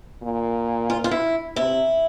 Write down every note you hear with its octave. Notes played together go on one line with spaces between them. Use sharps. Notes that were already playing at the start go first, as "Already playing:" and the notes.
A#2
F4
F4
E4
C3 E4